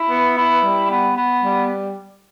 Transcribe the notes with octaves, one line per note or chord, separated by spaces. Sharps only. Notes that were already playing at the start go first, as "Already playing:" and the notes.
Already playing: E4
B3
E4
G3
B3
B3
G3